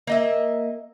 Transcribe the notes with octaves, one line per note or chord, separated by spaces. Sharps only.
A#3 D#5 E5